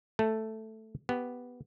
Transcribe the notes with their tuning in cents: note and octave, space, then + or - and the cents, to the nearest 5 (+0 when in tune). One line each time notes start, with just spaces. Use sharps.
A3 +0 A4 +0
B3 +0 G4 +0